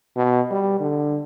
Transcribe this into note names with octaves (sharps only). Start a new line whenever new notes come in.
B2
G3
D3